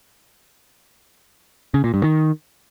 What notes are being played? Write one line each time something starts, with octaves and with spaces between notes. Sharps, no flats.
C#3
A#2
G2
D#3